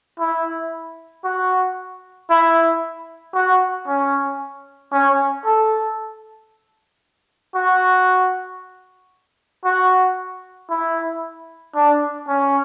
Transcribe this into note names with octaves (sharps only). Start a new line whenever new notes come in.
E4
F#4
E4
F#4
C#4
C#4
A4
F#4
F#4
E4
D4
C#4